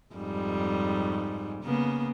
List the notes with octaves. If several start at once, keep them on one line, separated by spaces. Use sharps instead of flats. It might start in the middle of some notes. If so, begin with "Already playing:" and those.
F2 G#2 G3
C#3 A#3 B3